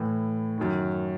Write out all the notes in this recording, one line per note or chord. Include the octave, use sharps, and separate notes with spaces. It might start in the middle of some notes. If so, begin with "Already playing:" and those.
Already playing: A2 E3
F#2 D#3